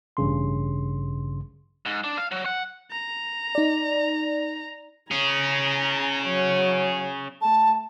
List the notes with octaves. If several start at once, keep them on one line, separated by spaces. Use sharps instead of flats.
A1 G2 C#3 C6
G#2
D4
F5
F#3
F#5
A#5
D#4 D5
C#4 G#4 G#5 A#5
F#3 C#5
A3 A5